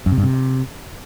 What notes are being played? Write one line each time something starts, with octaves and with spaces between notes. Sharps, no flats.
F#2
C3
G2
C3